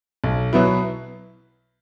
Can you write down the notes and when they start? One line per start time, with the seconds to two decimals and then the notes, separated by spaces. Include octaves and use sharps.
0.24 B1
0.53 B2 F#3 B3 E4